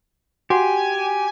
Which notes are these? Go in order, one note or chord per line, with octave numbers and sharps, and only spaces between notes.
F#4 G4 F#5 G#5